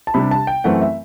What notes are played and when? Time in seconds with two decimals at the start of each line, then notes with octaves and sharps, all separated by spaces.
0.07 A5
0.14 C3 G3 D4 B5
0.31 A5
0.47 G5
0.64 F#2 E3 A3 C4 F#5
0.81 E5